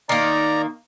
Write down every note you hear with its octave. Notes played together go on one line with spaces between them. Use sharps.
D#3 A#3 D5 A#5